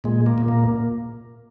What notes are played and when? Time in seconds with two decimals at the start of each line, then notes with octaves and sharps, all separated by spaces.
0.04 A#2 G#3
0.26 A#3
0.38 A#2
0.48 A#3